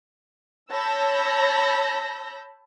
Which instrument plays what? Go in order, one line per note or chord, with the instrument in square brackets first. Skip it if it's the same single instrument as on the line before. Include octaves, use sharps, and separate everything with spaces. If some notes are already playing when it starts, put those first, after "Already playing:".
[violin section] C#5 A5 B5 E6 G6 A#6